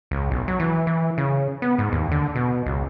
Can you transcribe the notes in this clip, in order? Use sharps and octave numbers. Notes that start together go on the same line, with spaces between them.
C#2
B1
F#3
E3
E3
C#3
B3
G#2
D#2
D3
B2
C#2